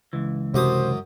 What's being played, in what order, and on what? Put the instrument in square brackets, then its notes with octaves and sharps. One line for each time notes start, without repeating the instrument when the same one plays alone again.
[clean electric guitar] C#2 E3
[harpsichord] F#2 D6 D#6 [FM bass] C3 [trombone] C5